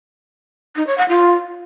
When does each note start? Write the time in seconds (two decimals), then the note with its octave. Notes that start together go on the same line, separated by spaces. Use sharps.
0.76 D#4
0.86 C#5
0.97 F#5
1.08 F4